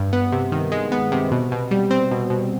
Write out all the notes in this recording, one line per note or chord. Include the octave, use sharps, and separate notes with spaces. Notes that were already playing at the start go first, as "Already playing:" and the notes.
Already playing: G2
B3
C3
D#3
G#3
B3
C3
B2
B2
G3
C4
B2
B2